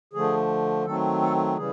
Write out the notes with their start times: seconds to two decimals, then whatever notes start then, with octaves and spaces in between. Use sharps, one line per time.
0.13 D3 F3 A3 G#4
0.86 D#3 F#3 A3 C4 A4
1.22 A4
1.57 C#3 E3 G3 G#4